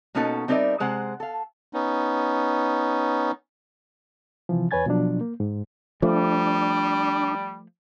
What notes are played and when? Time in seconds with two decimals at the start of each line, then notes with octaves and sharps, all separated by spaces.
0.15 B2 A#3 C#4 D#4 F#4 A4
0.48 G3 C4 D#4 A#4 D5 E5
0.80 C3 G#3 C5 F#5
1.20 A4 F5
1.73 B3 C#4 D#4
4.49 C3 E3 F3
4.71 E2 B4 C#5 G#5 G#6 A6
4.86 B2 F3 F#3 D4
5.21 A#3
5.40 G#2
6.02 F3 G3 A3 D4